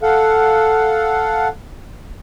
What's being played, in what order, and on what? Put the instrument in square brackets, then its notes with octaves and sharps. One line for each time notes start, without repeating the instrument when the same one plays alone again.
[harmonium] A4 F5 F#5